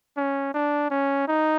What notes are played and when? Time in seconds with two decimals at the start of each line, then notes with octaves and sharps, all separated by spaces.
0.17 C#4
0.54 D4
0.90 C#4
1.28 D#4